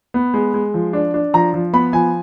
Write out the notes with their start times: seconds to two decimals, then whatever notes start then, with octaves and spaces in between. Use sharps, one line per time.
0.14 B3
0.34 G#3
0.54 G#3
0.74 F3
0.93 D4
1.14 D4
1.34 F3 A#5
1.54 F3
1.73 B3 B5
1.93 F3 G#5